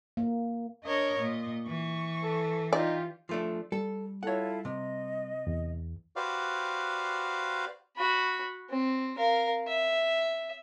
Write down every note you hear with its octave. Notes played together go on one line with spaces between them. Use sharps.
A#3
D4 A#4 C#5 D#5
A#2 D#5
E3 C#6
A4
D#4 F4 G4 D5
F3 A3 D4
G3 A4
E4 F4 A4 C#5 F#5
C3 D#5
E2
F#4 G4 B4 C5 D5 F5
F#4 B5
C4
A#4 F5
E5